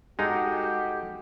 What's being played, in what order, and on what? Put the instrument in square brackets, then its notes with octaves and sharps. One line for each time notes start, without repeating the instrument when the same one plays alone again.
[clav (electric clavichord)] G#3 D#4 [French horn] F#4 [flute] G4 [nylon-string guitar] A4 F#5